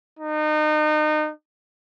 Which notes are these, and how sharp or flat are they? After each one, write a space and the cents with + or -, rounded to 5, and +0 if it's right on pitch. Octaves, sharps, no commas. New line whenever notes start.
D#4 -30